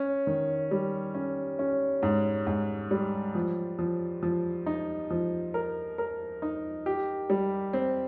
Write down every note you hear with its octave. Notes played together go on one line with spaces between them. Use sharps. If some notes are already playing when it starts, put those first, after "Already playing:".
Already playing: C#4
D#3
G3
C#4
C#4
G#2
G#2
G3
F3
F3
F3
D#4
F3
A#4
A#4
D#4
G4
G3
C4